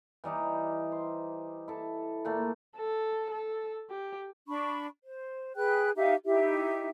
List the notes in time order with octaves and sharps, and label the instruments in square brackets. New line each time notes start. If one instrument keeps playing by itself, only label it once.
[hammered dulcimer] E3 G3 D#4 G4
C5
E4 A4
A#2 A3 A#3
[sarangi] A4
A4
G4
[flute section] D4 B5 C#6
C5
G#4 B4 G5 F#6
D#4 G4 E5 F5
D#4 E4 G4 E5